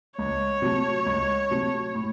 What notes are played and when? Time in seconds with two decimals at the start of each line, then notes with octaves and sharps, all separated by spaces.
0.18 C#2 C#5
0.62 C3 F#3 A3
1.06 C#2
1.50 C3 F#3 A3
1.95 A2